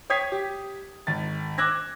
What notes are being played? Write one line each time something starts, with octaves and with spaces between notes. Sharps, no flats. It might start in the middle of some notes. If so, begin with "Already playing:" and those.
C#5 G5 D#6 G#6 B6 C7
G4
G#1 A6
D6 E6 F#6 G#6 A#6